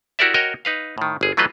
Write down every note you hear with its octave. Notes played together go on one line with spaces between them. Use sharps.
E4 F#4 G4 A#4 D5 E5
F#4 A#4 C#5 D#5 G5
D#4 B4 F5
A2 D#3
G1 G#4
E3 F#3 A3 F4 B4 D#5